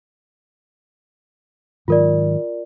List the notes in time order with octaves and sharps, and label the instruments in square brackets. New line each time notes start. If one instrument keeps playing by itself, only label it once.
[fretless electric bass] G#2 D#3 F#3 [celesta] F4 A#4 D5